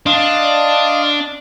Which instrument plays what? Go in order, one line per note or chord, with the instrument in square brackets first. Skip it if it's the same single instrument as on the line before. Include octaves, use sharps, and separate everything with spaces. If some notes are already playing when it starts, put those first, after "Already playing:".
[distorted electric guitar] D4 [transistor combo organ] D#5 F5 C6